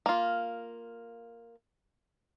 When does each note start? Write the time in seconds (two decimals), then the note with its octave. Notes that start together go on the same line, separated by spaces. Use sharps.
0.06 A#3 F4